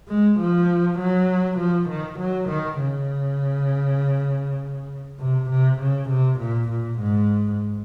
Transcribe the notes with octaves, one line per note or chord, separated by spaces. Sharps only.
G#3
F3
F#3
F3
D#3
F#3
D#3
C#3
C3
C3
C#3
C3
A#2
A#2
G#2